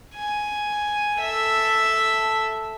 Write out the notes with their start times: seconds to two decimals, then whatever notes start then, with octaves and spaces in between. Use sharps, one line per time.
0.15 G#5
1.19 A4 E5